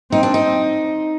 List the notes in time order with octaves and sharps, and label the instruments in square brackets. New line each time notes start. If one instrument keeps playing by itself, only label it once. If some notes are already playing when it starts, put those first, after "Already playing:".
[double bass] C4 [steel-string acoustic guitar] D#4
[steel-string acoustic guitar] D4
D#4